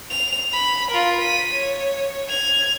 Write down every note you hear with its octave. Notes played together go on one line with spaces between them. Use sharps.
F7
B5
F4 A#4
B6 D#7
C#5
G#6 F7